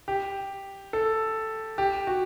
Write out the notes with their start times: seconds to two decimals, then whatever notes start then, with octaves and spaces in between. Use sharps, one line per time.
0.08 G4
0.93 A4
1.78 G4
2.07 F#4